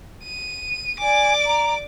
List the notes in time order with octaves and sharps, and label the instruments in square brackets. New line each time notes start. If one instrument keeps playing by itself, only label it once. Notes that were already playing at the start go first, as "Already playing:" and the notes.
[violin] D#7
[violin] D5 D6 [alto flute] G#5
[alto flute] A#5